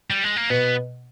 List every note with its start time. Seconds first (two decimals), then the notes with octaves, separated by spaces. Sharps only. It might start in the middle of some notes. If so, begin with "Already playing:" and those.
0.10 G3
0.24 G#3
0.37 A#3
0.50 B2 B3